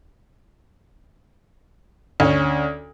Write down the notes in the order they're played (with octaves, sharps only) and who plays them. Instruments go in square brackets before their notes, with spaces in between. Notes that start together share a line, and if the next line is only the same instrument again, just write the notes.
[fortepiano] D2 C#4